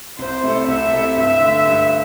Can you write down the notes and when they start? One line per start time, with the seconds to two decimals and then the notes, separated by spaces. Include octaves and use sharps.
0.19 C2 C5
0.44 C3 A3 E4 A4
0.68 C2 E5
0.92 C3 A3 E4 A4
1.16 G2 E5
1.41 D3 A3
1.65 G2